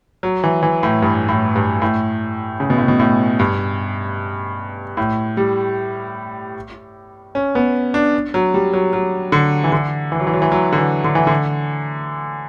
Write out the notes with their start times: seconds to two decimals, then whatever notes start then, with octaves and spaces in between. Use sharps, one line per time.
0.23 F#3
0.44 E3
0.63 E3
0.83 A2
1.02 G2
1.28 A2
1.55 G2
1.82 A2
2.60 C#3
2.70 B2
2.78 A2
2.88 B2
2.99 A2
3.39 G2
4.97 A2
5.37 G3
7.35 C#4
7.55 B3
7.94 D4
8.34 F#3
8.54 G3
8.73 F#3
8.93 F#3
9.32 D3
9.64 E3
9.72 D3
10.12 E3
10.20 F#3
10.27 E3
10.33 F#3
10.42 E3
10.52 F#3
10.72 D3
10.78 E3
11.04 D3
11.15 E3
11.27 D3